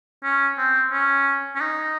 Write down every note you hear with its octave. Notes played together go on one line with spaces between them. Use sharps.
C#4
C4
C#4
C#4
D#4